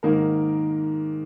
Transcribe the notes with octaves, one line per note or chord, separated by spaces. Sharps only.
G#2 D#3 A#3 D#4 A#4